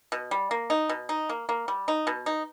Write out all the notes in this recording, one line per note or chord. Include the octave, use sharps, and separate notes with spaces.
B2
G3
A#3
D#4
B2
D#4
A#3
A#3
G3
D#4
B2
D#4